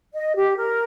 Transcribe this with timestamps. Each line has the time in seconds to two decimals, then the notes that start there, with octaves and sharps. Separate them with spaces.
0.14 D#5
0.35 G4
0.58 A#4